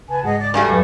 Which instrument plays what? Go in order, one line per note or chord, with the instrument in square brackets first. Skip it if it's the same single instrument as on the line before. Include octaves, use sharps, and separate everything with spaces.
[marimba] C#3 [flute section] B4 G#5 A5
[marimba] G#2 G#3 [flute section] G#4 D#5 F#5
[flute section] D5 D6
[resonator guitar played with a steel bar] G2 G3 A3 [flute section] F#4 F5 G#5
[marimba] F2 F#3 B4